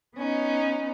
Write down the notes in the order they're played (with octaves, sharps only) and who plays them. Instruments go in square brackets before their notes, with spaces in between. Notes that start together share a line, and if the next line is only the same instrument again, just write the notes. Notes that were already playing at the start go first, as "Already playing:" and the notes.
[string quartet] B3 C#4 D#4